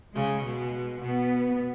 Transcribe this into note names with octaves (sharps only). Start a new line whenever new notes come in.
C#3 G#3
B2 G#3
B2 B3